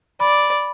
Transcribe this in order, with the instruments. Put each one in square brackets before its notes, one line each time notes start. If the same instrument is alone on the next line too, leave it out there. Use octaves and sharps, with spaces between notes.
[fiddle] D5 [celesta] B5